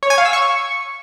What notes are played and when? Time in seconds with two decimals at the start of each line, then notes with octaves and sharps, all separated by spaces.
0.03 C#5
0.10 G#5
0.18 F5
0.26 E6
0.33 C#6